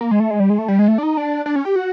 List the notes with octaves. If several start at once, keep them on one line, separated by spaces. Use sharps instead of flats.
A#3
G#3
A3
G#3
G3
G#3
A3
G3
G#3
A3
D4
D#4
D4
D4
C#4
G4
F#4